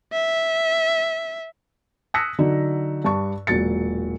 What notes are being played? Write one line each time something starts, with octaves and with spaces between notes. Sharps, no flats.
E5
D#6 E6 F#6 A#6 B6 C#7
D3 F#3 D#4
G2 A5 C#6
E1 A#2 F#3 A6 C#7